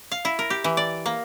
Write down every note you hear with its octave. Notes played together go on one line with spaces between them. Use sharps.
F5
E4
A#4
G4
E3
D5
A#3